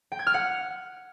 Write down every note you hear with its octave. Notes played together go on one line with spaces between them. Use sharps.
G5
G#6
F6
F#5